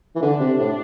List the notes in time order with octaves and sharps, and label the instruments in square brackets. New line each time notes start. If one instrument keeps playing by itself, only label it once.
[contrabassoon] E3
[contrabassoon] D3 [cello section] D4
[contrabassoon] C3
A2